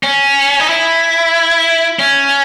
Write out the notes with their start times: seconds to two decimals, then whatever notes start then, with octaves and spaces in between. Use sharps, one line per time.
0.03 C#4
0.60 D#4
0.69 E4
1.99 C#4